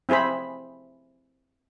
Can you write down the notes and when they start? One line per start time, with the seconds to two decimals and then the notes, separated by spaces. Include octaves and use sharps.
0.09 C4 E4 G#4 C5 B5